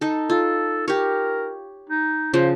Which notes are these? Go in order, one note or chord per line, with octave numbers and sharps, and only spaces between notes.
D#4 A4
F4 A4
G4 A#4 C#5
D#4
C#3 F3 C5